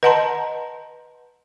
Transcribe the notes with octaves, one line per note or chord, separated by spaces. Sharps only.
B4 D#5 F#5 A5 A#5 C6